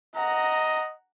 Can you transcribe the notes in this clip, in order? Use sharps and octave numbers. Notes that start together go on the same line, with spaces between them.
D#5 F#5 A#5